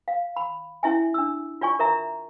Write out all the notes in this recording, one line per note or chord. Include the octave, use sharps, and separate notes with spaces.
F5
B5
C#4 E4 E5 G#5
D4 E6
F4 D5 G#5 C#6
A#4 D5 E5 A#5